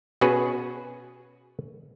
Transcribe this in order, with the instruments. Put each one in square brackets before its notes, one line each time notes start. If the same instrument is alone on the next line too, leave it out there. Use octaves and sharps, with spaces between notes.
[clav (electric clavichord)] B2 B3 C#4 F#4 G#4 B4